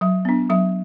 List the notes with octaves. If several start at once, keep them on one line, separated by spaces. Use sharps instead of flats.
F#3 E5
B3 D4
F#3 E5